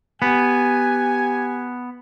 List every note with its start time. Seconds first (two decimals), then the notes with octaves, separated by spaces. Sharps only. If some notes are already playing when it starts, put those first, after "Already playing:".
0.22 B3 G4 G#5